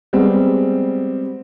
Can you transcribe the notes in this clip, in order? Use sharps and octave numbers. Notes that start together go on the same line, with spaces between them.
G3 G#3 B3 C4